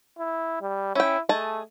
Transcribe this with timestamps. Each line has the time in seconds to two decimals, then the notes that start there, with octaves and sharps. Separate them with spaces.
0.18 E4
0.61 G3
0.95 C#4 E4 G5
1.29 A3 G#4 D#5 A5